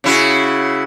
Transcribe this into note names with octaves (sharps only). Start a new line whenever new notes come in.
C#3 E4 F#4